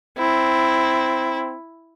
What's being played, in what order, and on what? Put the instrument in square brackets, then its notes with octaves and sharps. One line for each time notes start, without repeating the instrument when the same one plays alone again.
[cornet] C4 [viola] E4